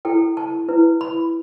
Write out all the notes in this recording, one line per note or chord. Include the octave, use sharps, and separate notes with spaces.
E4 A4 G5
A5
E4 B4
B5